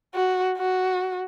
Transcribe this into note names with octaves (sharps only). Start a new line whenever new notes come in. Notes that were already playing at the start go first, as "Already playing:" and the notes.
F#4
F#4